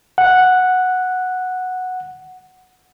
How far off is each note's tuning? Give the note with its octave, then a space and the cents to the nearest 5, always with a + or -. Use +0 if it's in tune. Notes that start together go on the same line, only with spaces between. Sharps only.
F#5 -5